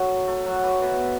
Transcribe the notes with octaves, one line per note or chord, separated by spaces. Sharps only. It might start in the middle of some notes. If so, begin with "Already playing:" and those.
Already playing: F#3 A3
A3
F#3
E3
B2